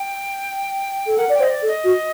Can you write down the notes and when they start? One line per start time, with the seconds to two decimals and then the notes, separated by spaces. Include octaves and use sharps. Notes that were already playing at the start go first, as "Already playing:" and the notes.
Already playing: G5
1.07 A4
1.17 A#4 F#5
1.29 D5
1.34 G5
1.40 C5
1.43 D#5
1.51 D5
1.62 A4
1.67 D#5
1.84 F#4